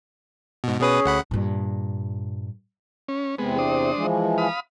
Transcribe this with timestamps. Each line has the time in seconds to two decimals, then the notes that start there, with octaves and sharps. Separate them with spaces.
0.64 G#2 B2
0.81 B2 C#4 G#4 B4 D#6
1.05 D2 F#5 B5
1.31 G2 A#2
3.09 C#4
3.38 E2 C3 G#3 B3 C4
3.58 D4 C5 D#6
3.95 E3 F3 G#3
4.38 F5 B5 D#6